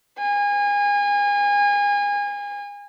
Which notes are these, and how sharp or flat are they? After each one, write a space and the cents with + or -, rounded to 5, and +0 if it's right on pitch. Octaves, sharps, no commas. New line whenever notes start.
G#5 -30